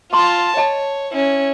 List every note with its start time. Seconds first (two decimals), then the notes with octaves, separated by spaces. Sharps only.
0.13 F4 A5 A#5 C6
0.57 C#5 D#5 A5
1.13 C#4 E4